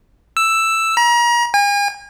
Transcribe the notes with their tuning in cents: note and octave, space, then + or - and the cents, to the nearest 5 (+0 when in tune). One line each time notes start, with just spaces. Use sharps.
E6 +5
A#5 +35
G#5 -40